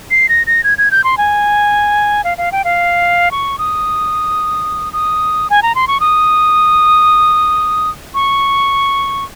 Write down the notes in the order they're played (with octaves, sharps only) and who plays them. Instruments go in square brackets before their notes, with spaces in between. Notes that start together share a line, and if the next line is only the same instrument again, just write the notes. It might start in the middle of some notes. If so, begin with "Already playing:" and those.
[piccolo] C7
A#6
A#6
G#6
G#6
G6
C6
G#5
F5
F5
G5
F5
C#6
D#6
D#6
G#5
A#5
C6
C#6
D#6
C#6